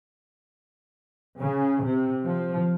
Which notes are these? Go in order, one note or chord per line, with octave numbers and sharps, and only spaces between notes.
C#3
C3
F3